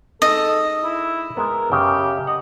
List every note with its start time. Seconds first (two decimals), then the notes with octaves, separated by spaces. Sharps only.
0.22 G#3 D#4 A4 D#5
0.84 E4
1.37 G#3 B3 A#4
1.72 F#2 C#3 G4 G5
2.27 D#5 F#5